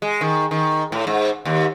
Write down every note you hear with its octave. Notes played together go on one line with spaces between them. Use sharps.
G#3
D#3
D#3
A2
G#2
D#2